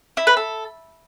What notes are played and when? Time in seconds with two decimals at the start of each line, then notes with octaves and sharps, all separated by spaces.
0.17 E4
0.27 B4
0.37 A4